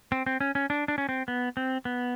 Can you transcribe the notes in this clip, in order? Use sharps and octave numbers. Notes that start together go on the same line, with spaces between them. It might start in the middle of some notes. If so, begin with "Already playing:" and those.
C4
C4
C#4
C#4
D4
D4
C#4
C4
B3
C4
B3